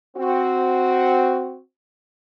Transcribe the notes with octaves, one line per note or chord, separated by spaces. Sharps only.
C4 F#4